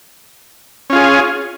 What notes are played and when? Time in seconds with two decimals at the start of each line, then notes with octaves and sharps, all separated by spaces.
0.90 C#4
0.93 F4
0.95 G#4